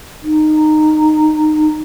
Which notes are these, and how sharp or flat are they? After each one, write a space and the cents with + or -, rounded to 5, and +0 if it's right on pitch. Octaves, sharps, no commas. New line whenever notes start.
D#4 -15